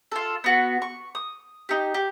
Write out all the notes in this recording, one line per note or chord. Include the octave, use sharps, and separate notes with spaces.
F4 A4
B3 F#4
C#6
D#6
D#4 G4
G4